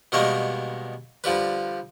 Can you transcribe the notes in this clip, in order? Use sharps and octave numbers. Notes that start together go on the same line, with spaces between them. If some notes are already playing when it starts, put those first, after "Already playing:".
B2 D#3 G3 G#3 A#3 B3
D3 F3 G3 B4